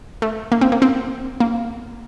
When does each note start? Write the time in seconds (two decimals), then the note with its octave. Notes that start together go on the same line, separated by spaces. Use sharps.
0.22 A3
0.52 A#3
0.61 C4
0.72 A#3
0.82 C4
1.40 A#3